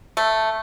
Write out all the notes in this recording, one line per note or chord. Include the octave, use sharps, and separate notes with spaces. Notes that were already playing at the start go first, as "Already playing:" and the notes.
A3